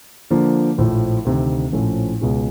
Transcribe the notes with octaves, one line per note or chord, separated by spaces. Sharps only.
D3 F3 A#3
A#1 A2 F3
D2 C3 D#3
A#1 A2 F3 A3 C#4
C#2 B2 G#3 C#4